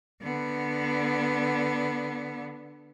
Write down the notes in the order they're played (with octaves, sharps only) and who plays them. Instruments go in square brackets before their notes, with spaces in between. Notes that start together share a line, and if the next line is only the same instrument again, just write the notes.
[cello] D3 B3